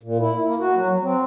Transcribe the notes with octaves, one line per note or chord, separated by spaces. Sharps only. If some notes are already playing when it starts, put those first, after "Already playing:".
A#2
E4
A#3
F#4
F#3
F#3
C4